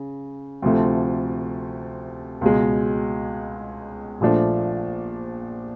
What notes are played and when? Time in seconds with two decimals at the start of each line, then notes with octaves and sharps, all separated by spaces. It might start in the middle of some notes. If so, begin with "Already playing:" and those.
Already playing: C#3
0.62 D2 C3 F3 A3
2.41 C#2 B2 G#3
4.20 A#1 A#2 F3 A3 D4